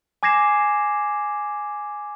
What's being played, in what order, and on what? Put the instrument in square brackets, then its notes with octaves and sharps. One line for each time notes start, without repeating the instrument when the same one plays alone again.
[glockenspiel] G#5 D6 G#6 A#6 C7 E7